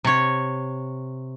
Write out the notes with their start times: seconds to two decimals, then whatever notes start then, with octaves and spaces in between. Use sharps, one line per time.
0.04 C3 C#5